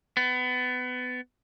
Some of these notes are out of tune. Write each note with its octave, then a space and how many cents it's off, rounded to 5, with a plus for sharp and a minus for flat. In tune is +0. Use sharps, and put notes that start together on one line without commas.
B3 +25